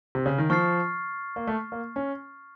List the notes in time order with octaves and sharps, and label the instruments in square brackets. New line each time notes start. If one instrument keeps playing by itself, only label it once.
[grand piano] C3
C#3
D#3
[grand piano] F3 [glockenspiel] C#6 F6 A6 C7
[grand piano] A#3
A3
A#3
C#4